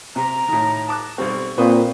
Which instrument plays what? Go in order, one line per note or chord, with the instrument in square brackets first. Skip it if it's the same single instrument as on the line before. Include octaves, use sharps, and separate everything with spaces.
[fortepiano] C3 [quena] A#5
[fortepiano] A2 D#3
A5 D6 F#6
[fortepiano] B1 G3 C4 [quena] C#6
[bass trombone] A#2 [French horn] C4 [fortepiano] B4 C5 D#6